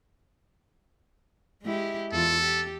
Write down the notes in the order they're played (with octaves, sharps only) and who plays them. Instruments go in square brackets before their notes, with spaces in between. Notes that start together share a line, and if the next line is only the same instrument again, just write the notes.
[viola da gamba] G#3 E4 G4
[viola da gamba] E2 F4 D5 [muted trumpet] A4
[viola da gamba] G4